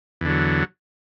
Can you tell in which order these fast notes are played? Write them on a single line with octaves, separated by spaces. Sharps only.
E2 D3 F#3